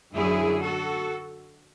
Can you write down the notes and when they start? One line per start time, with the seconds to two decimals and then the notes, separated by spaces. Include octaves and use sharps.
0.14 F#2 D3 F#3 E4 G#4
0.61 F#4 A4